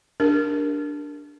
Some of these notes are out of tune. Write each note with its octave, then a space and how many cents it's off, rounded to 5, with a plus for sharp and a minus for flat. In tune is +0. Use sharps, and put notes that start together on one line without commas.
D4 +0 G4 +35 A#4 +5